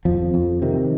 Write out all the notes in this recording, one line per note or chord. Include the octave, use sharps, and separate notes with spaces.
F2 F3
F2
C3 D#3